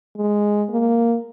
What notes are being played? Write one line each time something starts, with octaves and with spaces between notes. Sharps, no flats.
G#3
A#3